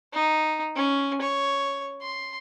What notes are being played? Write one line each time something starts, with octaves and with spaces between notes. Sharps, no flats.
D#4
C#4
C#5
C6